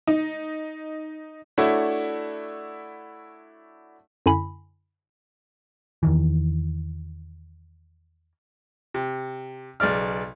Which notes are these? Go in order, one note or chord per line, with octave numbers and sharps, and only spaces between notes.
D#4
A3 D4 E4 F#4 C#5
F#2 D3 E4 G#5 B5
E2 D#3 E3
C3
B1 C#3 D5 F6